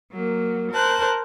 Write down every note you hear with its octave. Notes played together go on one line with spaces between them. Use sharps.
F#3 A#3
A#4 C5 A5 F#6